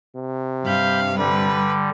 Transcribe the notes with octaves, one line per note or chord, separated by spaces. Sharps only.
C3
G2 F5 B5 G6
D3 G3 B4